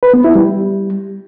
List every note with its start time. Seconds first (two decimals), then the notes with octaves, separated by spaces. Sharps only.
0.03 B4
0.14 B3
0.24 E4
0.35 G3